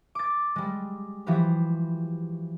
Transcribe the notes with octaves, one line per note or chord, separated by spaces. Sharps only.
D6 A6
G3 G#3
E3 F3 F#4 G4 B4